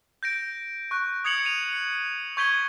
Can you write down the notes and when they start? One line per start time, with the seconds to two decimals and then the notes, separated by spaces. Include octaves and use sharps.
0.23 G6 A#6 D7
0.91 C#6 F#6
1.25 D#6 G#6 C#7 F7 F#7
1.45 D#7 F7
1.73 C#7
2.37 C#6 G6 G#6 B6 D#7 G7